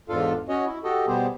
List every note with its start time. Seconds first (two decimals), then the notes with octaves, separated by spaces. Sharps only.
0.09 E2 G#2 D4 F4 A4 F5
0.49 C#4 F#4 C#5 D#5
0.66 E4
0.84 F#4 G4 A4 D#5
1.07 B2 G3 B3 G4 G#4 C5